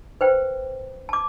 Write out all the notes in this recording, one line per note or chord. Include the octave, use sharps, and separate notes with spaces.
B4 C5 G5
A5 D6